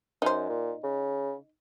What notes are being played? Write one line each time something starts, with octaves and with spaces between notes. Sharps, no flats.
F#2 D#4 C5
A#2
C#3